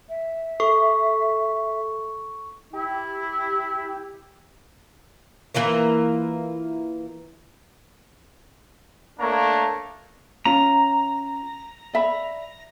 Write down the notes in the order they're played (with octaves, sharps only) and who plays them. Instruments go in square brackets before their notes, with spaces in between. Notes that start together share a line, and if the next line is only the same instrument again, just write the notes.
[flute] E5
[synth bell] A4 [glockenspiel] C#6
[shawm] E4 [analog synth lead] G4
[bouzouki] E3 A#3 F4 A#4
[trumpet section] A3 A#3 D4 C#5 A#5
[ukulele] C#4 F4 [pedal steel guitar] A#5
[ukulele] D5 E5 B5